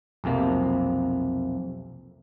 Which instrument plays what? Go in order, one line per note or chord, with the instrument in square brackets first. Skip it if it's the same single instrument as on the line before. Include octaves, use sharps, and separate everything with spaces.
[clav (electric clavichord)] B1 F2 C3 A#3